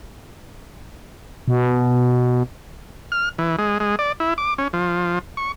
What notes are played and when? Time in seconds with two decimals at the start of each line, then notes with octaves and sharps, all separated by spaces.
1.48 B2
3.12 F6
3.39 E3
3.59 G#3
3.80 G#3
3.99 D5
4.20 E4
4.38 D6
4.58 C#4
4.73 F3
5.37 C#6